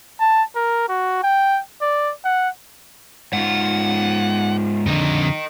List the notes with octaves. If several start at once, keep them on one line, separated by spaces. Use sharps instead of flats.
A5
A#4
F#4
G5
D5
F#5
G#2 F4 F#5
F2 D3 A#4 D#5